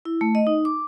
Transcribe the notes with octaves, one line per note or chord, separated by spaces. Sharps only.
E4
A3
D#5
D#4
D6